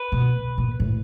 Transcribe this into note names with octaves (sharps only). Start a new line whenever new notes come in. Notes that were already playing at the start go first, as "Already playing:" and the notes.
Already playing: B4
B2
A#2
A2